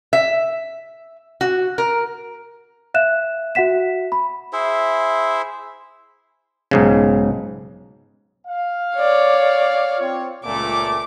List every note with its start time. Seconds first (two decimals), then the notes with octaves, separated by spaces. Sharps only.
0.13 E5
1.41 F#4
1.78 A#4
2.94 E5 F5 F#6 E7
3.55 F#4 E5 F#5 B6 E7
4.12 B5
4.53 E4 G#4 C5 E5
6.71 B1 G#2 C#3
8.48 F5
8.98 C#5 D5
9.99 C4 F4 C#5
10.45 C#2 A#2 A3 D6